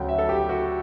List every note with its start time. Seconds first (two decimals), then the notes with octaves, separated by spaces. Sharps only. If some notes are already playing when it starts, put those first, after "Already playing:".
Already playing: D2 C#3 F#3 G5
0.09 E5
0.18 A4
0.29 G4
0.49 F#4